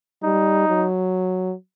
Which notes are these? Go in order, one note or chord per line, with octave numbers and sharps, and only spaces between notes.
G3 D#4
F#3